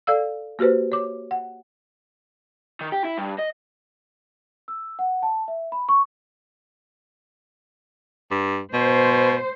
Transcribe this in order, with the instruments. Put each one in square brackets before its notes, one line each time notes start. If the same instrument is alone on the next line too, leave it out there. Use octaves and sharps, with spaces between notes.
[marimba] A4 D5 F5 E6
A#3 F#4 G4 B4 C5
C#5 D6
F#5
[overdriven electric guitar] D#3
G4
E4
G2
D#5
[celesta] E6
F#5
A5
E5
B5
C#6
[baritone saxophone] G2
[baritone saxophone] B2 [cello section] C5